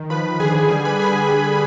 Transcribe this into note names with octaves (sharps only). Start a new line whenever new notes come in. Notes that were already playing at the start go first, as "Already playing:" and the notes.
Already playing: D#3
F3 B4 B5
D3 G#4 G#5
G3 G#4 G#5
B4 B5
D3 G#4 G#5